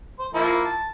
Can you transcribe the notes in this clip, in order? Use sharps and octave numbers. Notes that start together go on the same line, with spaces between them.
C5
F3 A#3 E4
A5